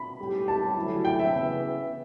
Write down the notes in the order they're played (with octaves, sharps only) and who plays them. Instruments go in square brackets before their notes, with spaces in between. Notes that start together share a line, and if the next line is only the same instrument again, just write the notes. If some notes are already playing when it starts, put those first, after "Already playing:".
Already playing: [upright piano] B5
[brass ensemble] B1 A2 G3 C#4 G4
[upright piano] A5
[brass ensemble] D2 C#3 F#3 C#4 E4
[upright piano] G5
E5
[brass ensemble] C#3 E3 B3